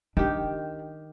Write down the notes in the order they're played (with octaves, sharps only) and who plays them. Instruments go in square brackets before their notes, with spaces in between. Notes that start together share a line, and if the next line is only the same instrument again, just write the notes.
[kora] D#3 G4 [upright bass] D4